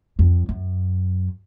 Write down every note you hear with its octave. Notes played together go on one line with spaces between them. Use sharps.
F2
F#2